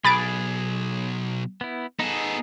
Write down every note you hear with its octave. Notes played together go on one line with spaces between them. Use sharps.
B1 G#4 B5 A6 D7
B3 E4
B3 D#4 G#4 A4